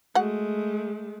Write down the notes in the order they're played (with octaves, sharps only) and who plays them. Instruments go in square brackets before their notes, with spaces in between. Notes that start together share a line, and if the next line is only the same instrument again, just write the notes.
[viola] G#3 A3 [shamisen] F#4 F#5